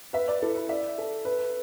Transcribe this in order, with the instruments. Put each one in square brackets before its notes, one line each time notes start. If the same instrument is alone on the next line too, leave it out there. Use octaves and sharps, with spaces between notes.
[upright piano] B4 [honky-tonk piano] E5
[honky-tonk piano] D5
[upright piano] E4 [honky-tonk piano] A4
[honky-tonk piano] B4
[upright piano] D5 [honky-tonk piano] E5
[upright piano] A4
B4